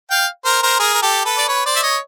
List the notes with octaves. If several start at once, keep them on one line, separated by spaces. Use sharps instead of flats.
F5 G5
A#4 C5
A#4 C5
G#4 A#4
A#4
G4 A4
A4 B4
D5
B4 C#5
C5 D5
E5
C#5 D#5